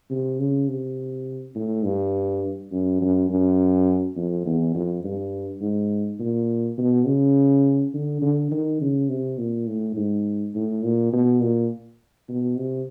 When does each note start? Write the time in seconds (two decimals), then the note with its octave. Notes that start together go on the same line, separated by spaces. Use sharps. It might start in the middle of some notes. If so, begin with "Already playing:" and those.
0.11 C3
0.40 C#3
0.68 C3
1.55 A2
1.84 G2
2.72 F#2
3.01 F#2
3.29 F#2
4.16 F2
4.46 E2
4.74 F2
5.04 G2
5.61 G#2
6.19 A#2
6.78 B2
7.06 C#3
7.94 D3
8.22 D3
8.51 D#3
8.81 C#3
9.09 C3
9.38 A#2
9.67 A2
9.96 G#2
10.55 A2
10.83 A#2
11.13 B2
11.41 A#2
12.29 B2
12.57 C3